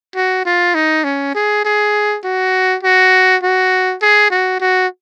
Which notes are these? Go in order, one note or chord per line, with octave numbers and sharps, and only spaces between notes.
F#4
F4
D#4
C#4
G#4
G#4
F#4
F#4
F#4
G#4
F#4
F#4